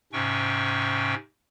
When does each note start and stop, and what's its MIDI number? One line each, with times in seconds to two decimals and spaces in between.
0.13 1.14 44
0.13 1.14 48
0.13 1.14 61
0.13 1.14 79
0.13 1.14 85